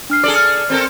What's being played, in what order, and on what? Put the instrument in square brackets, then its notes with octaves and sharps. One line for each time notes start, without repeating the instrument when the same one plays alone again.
[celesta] D4 F6 C7
[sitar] G#4 A4 D5
[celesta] F6
[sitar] C4 A4 A#4